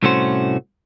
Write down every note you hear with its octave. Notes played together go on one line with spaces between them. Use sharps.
C2 A2 A3 C#4 F#4 C5